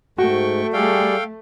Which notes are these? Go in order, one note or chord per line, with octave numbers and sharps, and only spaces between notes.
G#2 A3 F#4 G5 C#6
G3 G#4 A4 D5 F5 G5